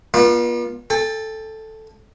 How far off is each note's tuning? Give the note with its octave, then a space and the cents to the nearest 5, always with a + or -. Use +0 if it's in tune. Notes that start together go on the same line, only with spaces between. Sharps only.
B3 -45 D4 +45 F4 +0
A4 +0 G5 +40